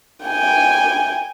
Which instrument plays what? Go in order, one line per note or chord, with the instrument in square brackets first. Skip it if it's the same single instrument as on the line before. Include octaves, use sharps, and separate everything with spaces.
[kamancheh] G5 G#5